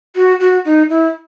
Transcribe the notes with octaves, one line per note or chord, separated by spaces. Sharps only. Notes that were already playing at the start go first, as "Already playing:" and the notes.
F#4
F#4
D#4
E4